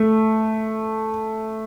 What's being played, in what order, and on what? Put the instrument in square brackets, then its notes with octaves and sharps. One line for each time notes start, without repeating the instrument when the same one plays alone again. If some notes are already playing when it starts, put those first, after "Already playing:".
Already playing: [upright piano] A3